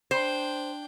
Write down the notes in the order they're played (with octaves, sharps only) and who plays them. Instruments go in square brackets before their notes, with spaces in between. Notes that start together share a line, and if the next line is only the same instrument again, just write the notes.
[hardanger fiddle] D4 G5 [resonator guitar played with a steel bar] C5